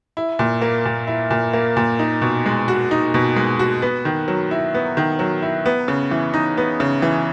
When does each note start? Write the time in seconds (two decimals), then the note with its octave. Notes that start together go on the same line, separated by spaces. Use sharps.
0.17 E4
0.39 A#2
0.62 A#3
0.85 A#2
1.07 E4
1.31 A#2
1.53 A#3
1.77 A#2
1.99 D#4
2.22 B2
2.46 G#3
2.68 F#4
2.91 D#4
3.14 B2
3.36 G#3
3.59 F#4
3.82 B3
4.05 D#3
4.28 F#3
4.51 E4
4.74 B3
4.97 D#3
5.19 F#3
5.42 E4
5.66 B3
5.88 C#3
6.11 E3
6.34 D#4
6.57 B3
6.80 C#3
7.02 E3